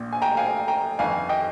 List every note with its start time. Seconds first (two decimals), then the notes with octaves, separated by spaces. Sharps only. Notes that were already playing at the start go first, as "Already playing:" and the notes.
Already playing: A#1 A#2
0.13 G#5
0.22 G5 A#5
0.37 F5 G#5
0.68 G5 A#5
0.99 G1 F2 D#3 F5 G#5
1.29 D#5 G5